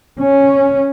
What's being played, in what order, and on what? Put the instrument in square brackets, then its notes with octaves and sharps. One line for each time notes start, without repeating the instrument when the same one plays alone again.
[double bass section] C#4